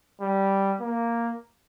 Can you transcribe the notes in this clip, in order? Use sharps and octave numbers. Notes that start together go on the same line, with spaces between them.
G3
A#3